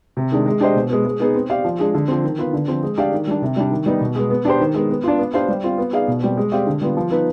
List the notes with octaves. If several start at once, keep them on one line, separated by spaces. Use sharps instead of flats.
C3
D#3 G#3 D4
G#3
D4 G4 C5 D#5
B2
G#3 B3
G#3
B3 D#4 G#4
C4
G4 D5 F5
F3
G#3 D4 G#4
D3
F3 C4
D#3
B3 F4 B4
D3
F3 C4
G#3
D4 G4 D5 F5
D#3
G3 D4
C3
G3 D4
D#3
G3 B3 D#4
B2
G#3 B3
B3
D4 G4 C5
D#3
G#3 B3
B3
D4 F4
B3
D4 G4 C5 F5
G3
C4 F4
B3
D#4 G#4 D5 F5
B2
G3 C4
G#3
C4 G4 D5 F5
D3
G3 B3 F4
F3
B3 D#4 B4